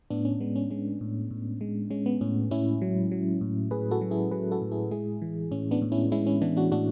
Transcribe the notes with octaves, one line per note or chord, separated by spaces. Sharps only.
A2 B3 D4
C#4
G#3 B3
C#4
G#3 C#4
A2
A2
G#3
G#3 C#4
B3
A2 C#4
A2 C#4 E4
F#3
F#3
A2
A2 G#4 B4
F#4 A4
F#3
E4 G#4
F#3 G#4 B4
F#4 A4
A2
E4 G#4
G#3 E4 G#4
E3
A2 C#4
B3 D4
A2
C#4 E4
G#3 C#4 E4
C#4
E3 B3 D4
D4 F#4
A2 D4 F#4